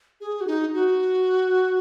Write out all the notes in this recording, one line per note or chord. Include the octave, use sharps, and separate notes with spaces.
G#4
F#4
D#4
F#4